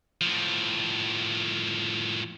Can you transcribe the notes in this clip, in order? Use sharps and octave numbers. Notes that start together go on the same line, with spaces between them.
A2 F3